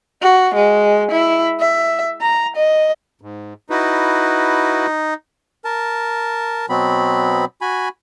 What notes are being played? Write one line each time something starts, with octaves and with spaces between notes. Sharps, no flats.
F#4
G#3
E4
E5
A#5
D#5
G#2
D#4 E4 F#4 B4
A#4 A5
B2 F#3 B3 C4 B5
F#4 G#5 B5